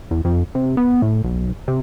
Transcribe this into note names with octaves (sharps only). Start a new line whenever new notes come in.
E2
F2
C3
B3
A2
B1
C3